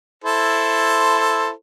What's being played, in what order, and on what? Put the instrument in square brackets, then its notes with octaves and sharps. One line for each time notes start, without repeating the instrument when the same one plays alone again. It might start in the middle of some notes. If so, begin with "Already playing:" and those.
[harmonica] E4 A4 C5